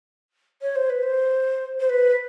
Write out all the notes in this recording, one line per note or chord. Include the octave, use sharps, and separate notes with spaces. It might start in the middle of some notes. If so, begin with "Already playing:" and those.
C#5
C5
B4
C5
C5
B4